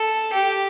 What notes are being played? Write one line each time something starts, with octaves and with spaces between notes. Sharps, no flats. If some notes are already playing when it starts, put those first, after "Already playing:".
Already playing: A4
G4